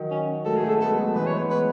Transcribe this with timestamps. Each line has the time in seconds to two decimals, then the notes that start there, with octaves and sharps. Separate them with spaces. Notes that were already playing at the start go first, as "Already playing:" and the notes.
Already playing: D#3 F#3
0.11 C#4
0.45 F#3 A3 A4
0.56 G#4
0.63 F#3 A3
0.69 A4
0.80 G#3 B3 A4
0.98 F#3 A3
1.15 E3 G#3 B4
1.27 C#5
1.38 G#3 B3 B4
1.50 B4